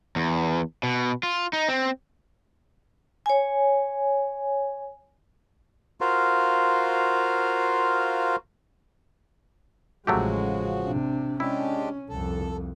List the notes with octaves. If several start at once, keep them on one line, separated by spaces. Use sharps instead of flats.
E2
B2
F4
D#4
C4
C#5 G#5
F4 F#4 A#4 C5 F5
A1 C#3 F3 F#3 G#3 A3 F#4 G4
C3 D4
G#3 C#4 D4 E4 G4
C2 F2 A4